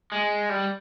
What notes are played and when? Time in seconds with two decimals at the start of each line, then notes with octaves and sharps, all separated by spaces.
0.12 G#3
0.49 G3